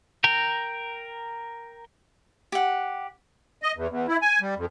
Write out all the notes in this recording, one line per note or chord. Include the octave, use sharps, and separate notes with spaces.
A#4 G5 A#5
G4 F#5
D#5
E2
E2
E4
G#5
G3
F2